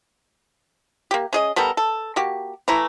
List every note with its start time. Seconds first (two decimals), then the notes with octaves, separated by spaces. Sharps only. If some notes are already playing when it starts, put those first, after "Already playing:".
1.11 A#3 G4
1.33 C#4 G#4 D#5
1.56 G3 B3 A4 A#4
1.77 A4
2.16 A#3 F#4 G4
2.68 E3 A3 E4 A#5